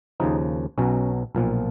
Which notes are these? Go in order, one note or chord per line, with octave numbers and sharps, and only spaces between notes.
D#2 C#3 F3 D#4
B1 B2 F#3 C#4
B1 A#2 F3